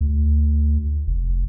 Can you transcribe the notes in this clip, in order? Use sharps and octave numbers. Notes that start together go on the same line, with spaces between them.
D2
F1